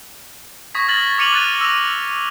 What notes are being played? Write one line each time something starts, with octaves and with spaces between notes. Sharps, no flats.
C#6 D#6 G#6 A#6 B6
F6 A6 A#6 F#7
D6 F6 C#7 D#7 F7 F#7
F6 F#6 A6 D#7
E6 A#6 D#7 F7